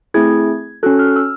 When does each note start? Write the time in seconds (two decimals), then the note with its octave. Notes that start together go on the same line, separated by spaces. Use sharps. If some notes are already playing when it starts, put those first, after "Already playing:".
0.14 A3 C4 E4 G#4 G#6
0.83 C#4 F#4 A4 F#6
0.99 F6
1.16 E6